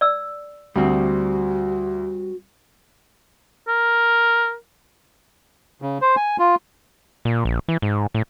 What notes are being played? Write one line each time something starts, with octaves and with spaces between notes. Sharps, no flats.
D5 E6
D2 G3 C4 F#4
A#4
C#3
C5
G#5
F4
A#2
A#1
E3
G#2
A2